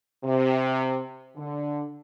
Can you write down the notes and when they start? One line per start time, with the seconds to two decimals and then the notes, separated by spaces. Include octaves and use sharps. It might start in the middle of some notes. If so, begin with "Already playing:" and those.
0.24 C3
1.36 D3